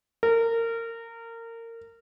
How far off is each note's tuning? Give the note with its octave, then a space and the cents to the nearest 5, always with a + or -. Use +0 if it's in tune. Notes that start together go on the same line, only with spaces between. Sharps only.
A#4 -25